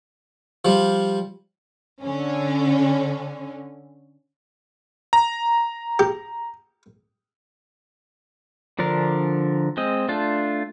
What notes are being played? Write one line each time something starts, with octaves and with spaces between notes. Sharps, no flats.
F3 G3
D3 C#4
A#5
G4
D3 F3 D4 A#4
G#3 C4 D#5
A3 D4 F4